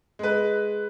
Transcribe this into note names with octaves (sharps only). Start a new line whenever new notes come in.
G#3 B4